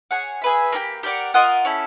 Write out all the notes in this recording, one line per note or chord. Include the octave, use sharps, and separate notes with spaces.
G#4 C#5 F#5
G#4 B4 E5
A#3 D4 G4
G4 A#4 D5 F#5
F4 A#4 D#5 F#5
C#4 E4 A4